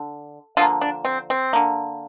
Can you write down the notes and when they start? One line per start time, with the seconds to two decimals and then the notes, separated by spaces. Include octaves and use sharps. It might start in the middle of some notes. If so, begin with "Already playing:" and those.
Already playing: D3
0.57 D3 F3 A#3 F4
0.81 D4
1.05 C4
1.30 C4
1.53 D3 A#3